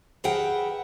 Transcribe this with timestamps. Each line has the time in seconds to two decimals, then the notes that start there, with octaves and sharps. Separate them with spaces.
0.24 G#4 A#4 B4 E5 F#5 G5